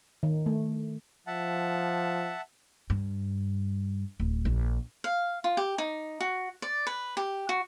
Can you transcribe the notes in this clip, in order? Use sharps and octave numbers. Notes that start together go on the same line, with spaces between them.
D#3
A3
F3 E5 F#5 A5
G2
D1
A#1
F5
F4
G4
D#4
F#4
D5
B4
G4
F#4